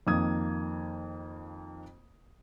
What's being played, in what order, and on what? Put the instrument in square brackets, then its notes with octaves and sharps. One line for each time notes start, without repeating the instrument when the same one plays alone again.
[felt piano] F2 D#3 A#3 D#6 G#6